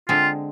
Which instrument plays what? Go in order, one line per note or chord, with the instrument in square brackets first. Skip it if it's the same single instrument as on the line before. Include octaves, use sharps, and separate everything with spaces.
[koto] D3 G#3 C4 [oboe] F4